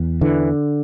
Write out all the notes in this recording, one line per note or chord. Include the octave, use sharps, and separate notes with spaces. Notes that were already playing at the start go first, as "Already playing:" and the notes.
Already playing: E2
D3 E3